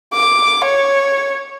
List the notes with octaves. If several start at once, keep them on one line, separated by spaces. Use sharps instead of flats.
D6
C#5